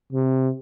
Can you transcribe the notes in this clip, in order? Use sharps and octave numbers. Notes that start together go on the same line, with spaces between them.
C3